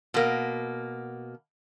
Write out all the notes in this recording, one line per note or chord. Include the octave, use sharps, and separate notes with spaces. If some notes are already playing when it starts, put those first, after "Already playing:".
B2 A#3